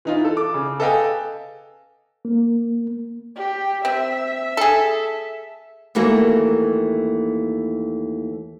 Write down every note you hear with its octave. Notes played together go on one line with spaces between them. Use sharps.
E3 D#4 F4
A4
D6
C#3
A4 B4 D#5 F5 G5 G#5
A#3
G4
C4 E5
G#4 A4
D#2 E3 A3 A#3 F#4